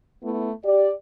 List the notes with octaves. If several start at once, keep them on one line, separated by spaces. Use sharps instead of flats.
A3 B3 E4
G4 D5